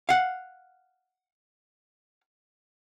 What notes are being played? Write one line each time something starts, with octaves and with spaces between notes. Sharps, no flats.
F5 F#5